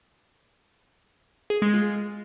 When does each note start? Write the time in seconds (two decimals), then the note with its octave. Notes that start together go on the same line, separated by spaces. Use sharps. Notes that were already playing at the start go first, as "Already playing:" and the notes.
1.50 G#4
1.62 G#3
1.74 F4